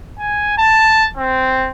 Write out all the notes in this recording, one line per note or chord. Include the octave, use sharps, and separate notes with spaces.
G#5
A5
C4